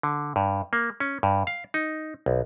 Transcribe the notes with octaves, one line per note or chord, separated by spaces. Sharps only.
D3
G2
A#3
C#4
G2
F5
D#4
B1